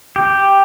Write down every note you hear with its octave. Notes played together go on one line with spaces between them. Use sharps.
G4